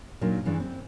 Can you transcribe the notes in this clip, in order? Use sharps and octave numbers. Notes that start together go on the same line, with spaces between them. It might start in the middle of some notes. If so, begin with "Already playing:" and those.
A#2 F#3 D4 D#4 A#4
G2 C#3 E3 G#3 D4
C4